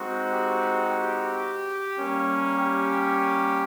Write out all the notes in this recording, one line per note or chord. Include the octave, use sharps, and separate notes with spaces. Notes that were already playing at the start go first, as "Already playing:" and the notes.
Already playing: G#3 C4 D#4 F#4
G4
G4
G3 A#3 C#4
G4